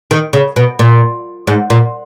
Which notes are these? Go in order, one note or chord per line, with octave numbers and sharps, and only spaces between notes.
D#3
C#3
B2
A#2
G#2
A#2